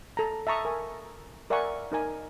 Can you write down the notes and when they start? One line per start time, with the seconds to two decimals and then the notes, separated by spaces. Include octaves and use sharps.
0.17 A4 A#5
0.47 E5 A5 A#5 C#6 D#6
0.65 A#4 G#5 C#6
1.50 A#4 D5 E5 F#5 G#5 C#6
1.92 D#4 A#4 G#5